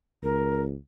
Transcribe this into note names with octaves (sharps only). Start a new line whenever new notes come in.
C#2 A#4